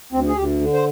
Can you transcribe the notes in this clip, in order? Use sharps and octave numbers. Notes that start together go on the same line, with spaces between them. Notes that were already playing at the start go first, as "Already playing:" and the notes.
D2 C4
G#4
D2 G4
D3
C5